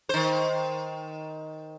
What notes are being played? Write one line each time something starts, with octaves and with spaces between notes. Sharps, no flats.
D#3 C5